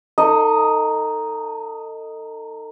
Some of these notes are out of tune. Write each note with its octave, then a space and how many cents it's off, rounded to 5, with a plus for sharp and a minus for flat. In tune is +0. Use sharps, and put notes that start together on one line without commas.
D#4 +0 A4 +35 D#5 +0